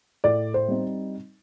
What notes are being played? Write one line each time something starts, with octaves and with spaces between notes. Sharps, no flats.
A2 D5
C5
G3 C4 D#4